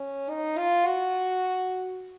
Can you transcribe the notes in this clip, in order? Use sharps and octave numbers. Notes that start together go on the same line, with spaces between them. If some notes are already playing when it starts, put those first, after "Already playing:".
Already playing: C#4
D#4
F4
F#4